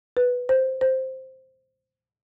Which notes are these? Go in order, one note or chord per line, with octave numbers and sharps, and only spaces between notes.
B4
C5
C5